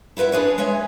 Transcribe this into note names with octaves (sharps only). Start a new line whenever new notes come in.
E4 F4 B4 E5 F#5
D4 G#4 B4 C#5
G#3 C#5 E5 G#5